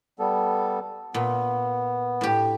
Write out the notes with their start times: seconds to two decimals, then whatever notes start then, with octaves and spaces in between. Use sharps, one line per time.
0.19 G3 B3 A4
1.14 A#2 B3
2.21 A2 G4